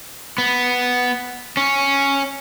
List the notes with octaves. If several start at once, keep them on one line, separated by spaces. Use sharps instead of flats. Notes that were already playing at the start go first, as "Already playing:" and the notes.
B3
C#4